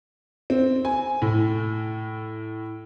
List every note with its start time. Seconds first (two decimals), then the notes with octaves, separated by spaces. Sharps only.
0.50 C4
0.85 G#5
1.22 A2